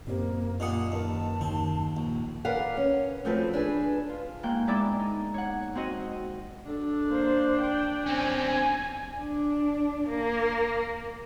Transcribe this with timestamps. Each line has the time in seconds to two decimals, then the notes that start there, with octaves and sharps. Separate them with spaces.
0.07 F#2 A#3 C4 G4 C5
0.60 A#2 D4 F4 D#5 F#5 D#6
0.92 D#2 A#4 B4 D#5 A5
1.41 D#2 C4
1.97 A#1
2.45 A#4 B4 D5 F5 F#5
2.77 C#4
3.25 F3 A3 C4 F#4 A4 B4
3.53 D4 G#4 B4
4.09 F4
4.43 G#2 A#3 G5 F#6
4.67 G#3 B3 D4 E4 D5 E5
5.00 D#4
5.34 C#5 F#5
5.75 C4 F#4 D#5
6.66 D4 A4
7.08 A#3 C5
7.60 G5
8.06 C4 C#4 G#5
8.46 G#5
9.20 D4
10.10 A#3